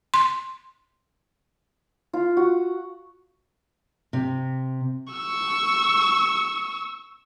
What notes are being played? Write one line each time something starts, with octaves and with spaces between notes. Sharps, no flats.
C6
F4
F#4
C3
C#6 E6